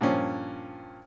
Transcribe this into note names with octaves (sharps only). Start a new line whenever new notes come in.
G2 A#2 F3 C#4